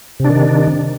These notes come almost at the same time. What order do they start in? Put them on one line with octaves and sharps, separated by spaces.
C3 D4 D#3